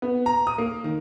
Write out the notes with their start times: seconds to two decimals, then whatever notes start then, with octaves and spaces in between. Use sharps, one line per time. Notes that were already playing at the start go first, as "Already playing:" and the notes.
0.02 B3
0.26 A#5
0.47 D#6
0.58 A#3
0.84 D#3